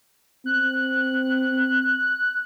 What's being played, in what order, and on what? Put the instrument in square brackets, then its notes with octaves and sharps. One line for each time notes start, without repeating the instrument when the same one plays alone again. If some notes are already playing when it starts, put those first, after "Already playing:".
[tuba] C4 [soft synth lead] F#6